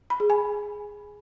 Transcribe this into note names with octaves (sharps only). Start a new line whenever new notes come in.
B5
G#4
G#5